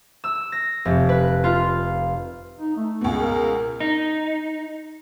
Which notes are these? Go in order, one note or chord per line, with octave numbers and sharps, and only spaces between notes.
E6
A#6
F1
B4
F4
D#4
A3
C#2 B2
A#4
D#4